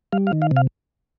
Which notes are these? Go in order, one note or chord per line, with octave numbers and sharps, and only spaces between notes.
G3 F5
F5
D#3
F5
C3
F5